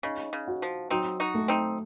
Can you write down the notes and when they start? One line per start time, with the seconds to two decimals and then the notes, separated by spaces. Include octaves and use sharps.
0.03 C#3 D#4
0.33 C#3
0.48 F#4
0.62 F3
0.90 F#3 C4 D#4
1.20 D#4 F#4
1.34 A3
1.48 C4 D#4